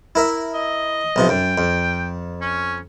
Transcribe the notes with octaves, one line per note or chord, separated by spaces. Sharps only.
E4 A#4 E5
D#5
B1 C3 F3
F#2 G5
F2
C#4